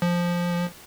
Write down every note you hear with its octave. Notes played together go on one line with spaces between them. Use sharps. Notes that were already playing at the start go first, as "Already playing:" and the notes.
F3